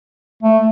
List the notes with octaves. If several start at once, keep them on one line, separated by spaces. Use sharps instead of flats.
A3